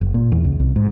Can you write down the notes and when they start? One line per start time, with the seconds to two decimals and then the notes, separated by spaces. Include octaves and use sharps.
0.01 F#1
0.14 A#2
0.32 E2
0.44 C#2
0.60 C2
0.76 G#2